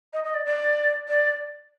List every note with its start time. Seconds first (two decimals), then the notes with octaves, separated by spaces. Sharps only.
0.13 D#5
0.24 D#5
0.34 D5
0.46 D5
1.09 D5